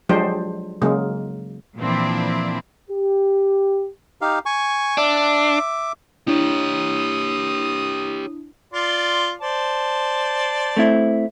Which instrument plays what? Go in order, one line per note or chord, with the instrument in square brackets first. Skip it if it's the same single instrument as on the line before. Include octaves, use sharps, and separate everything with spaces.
[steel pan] F3 F#3 G#3 D4 G4 C5
C#3 F#3 G#3 A#3
[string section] A#2 E3 F3 C4 D4 E4
[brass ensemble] G4
[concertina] D#4 G4 F5
G#5 C#6
[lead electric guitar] D4 [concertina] E5 D6
[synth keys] D4 E4 [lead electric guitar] G4 C#5 [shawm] D#6
[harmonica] F4 D5 C6
C5 D5 A5
[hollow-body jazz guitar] A3 C4 E4